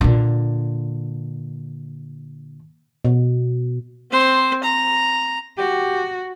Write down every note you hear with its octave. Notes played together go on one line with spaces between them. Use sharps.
A#2 D3
B2
C4 C5
A#5
F#4 G4